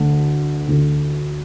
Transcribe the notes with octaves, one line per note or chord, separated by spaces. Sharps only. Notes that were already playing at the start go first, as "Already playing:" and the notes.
Already playing: D2 D3 A3
D2 D3 A3